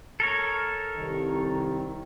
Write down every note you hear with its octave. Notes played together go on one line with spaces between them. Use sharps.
A4 A#4 C#5
C2 D#3